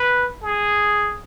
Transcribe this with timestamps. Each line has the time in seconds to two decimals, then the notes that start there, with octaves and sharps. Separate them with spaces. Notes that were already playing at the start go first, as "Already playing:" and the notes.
Already playing: B4
0.43 G#4